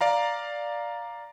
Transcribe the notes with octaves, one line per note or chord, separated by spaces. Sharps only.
D5 F5 A#5